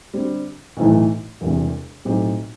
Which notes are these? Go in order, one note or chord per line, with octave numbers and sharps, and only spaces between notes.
D3 G3 C4
B1 A2 E3 A3
E1 E2 C3 G3
B1 A2 F#3 C4 G4